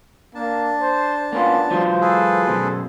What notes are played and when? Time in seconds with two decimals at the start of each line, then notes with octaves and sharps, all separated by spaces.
0.35 A#3 D4 A5
0.81 C5
1.32 A#3 B3 C#4 F4
1.71 E3 F#3 F4 C5
2.01 G#4 A4 B4
2.48 F#2 B2 C5